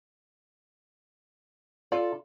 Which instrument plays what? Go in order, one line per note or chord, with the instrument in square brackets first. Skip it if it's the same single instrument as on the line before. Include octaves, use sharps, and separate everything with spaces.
[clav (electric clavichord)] F4 [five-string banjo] A4 D5